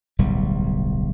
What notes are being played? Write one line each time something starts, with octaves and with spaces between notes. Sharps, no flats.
D1 B1 G3